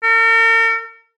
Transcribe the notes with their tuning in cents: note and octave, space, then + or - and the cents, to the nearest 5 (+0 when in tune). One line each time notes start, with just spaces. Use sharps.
A#4 -45